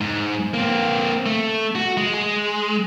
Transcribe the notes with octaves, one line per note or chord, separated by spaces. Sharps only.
G#2
A#3 C4
A3
F#4
G#3
G#3